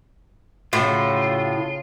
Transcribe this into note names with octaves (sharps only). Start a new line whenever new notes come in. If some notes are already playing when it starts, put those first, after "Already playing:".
A2 C#3 F4 F#4